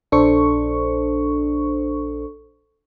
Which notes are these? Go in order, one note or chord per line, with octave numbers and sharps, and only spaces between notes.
A#1 D4 A4 C5 C#6